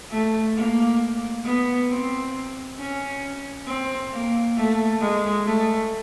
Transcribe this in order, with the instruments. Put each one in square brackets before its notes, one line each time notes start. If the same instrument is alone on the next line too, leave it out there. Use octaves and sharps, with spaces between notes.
[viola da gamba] A3
A#3
B3
C4
C#4
C4
A#3
A3
G#3
A3